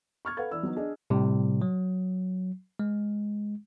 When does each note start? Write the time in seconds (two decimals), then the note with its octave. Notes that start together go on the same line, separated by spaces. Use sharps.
0.25 C#6 F6 G#6
0.37 A4 B4 F5 F#5 G#6
0.51 E3 E4 D5 E6
0.63 F#3 B3 D#4
0.76 D4 G#4 D5 D#5
1.10 A2 C3 G3
1.62 F#3
2.79 G#3